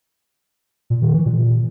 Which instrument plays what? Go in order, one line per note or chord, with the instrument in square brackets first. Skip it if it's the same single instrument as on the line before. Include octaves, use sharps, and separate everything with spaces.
[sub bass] A#2
D#3
E3
A#2